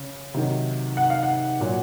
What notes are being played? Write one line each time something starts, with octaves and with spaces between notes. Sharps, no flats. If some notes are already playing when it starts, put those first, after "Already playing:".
Already playing: C#3
C3 D#3 F#3
F#5
F5
F#5
A#2 F#3